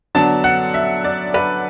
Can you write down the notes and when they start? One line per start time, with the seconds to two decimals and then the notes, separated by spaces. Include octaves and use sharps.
0.15 D3 F#3 B3 D4 A5
0.44 F#5
0.74 E5
1.04 D5
1.34 B4